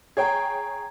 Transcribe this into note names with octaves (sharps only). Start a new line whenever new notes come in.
G#4 C#5 G5 A#5 G#6